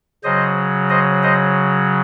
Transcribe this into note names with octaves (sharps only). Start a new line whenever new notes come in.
C#3 F#3 C5 D#5
C5 D#5
C5 D#5